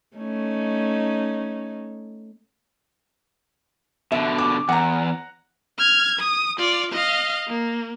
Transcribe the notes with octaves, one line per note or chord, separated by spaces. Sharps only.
A3 C#4 D#4
B2 D3 E5
D6
E2 F#5 A#5
F6 G#6
D#6
F4 D5
D#5 F5
A#3